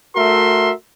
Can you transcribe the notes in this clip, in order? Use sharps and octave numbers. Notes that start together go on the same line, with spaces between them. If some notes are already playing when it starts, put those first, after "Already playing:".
A3 F#4 A#4 E5 C6